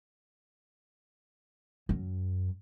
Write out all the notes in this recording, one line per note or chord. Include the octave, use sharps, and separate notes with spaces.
F#2